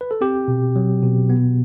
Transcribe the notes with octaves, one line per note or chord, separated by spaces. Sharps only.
B4
A4
C4 G4
B2
F#3
B2
B3